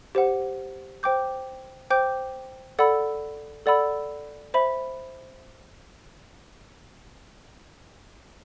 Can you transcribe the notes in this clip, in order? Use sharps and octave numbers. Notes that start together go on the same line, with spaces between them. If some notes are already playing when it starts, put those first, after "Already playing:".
G4 C5 F#5
C5 G5 D6 G6
C5 G5 D6 G6
A4 D5 F#5 B5 E6
A4 D5 F#5 B5 E6
C5 E5 B5